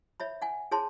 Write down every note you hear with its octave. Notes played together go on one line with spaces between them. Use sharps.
C#5 E5 B5
F#5 G#5
G#4 C#5 A5 C6